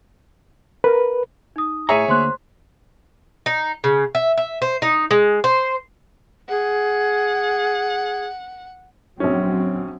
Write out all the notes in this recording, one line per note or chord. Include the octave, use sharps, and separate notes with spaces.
A#4 B4
D#4 D#6
A2 G#4 C#5 E5 A#5 C#7 D#7
D2 A#3 C5 C6 F#6
D#4
C#3
E5
E5
C5
D#4
G#3
C5
G#4 F#5
A#1 F#3 C4 C#4